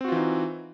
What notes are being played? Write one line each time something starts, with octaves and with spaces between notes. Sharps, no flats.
E3 C4 D#4 F4 F#4